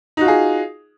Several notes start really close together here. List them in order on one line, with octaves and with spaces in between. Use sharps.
D#4 F#4 F4 G#4